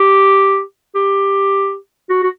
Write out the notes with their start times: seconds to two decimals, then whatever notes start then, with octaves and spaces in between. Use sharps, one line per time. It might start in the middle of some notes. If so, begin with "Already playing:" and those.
Already playing: G4
0.95 G4
2.09 F#4
2.23 F#4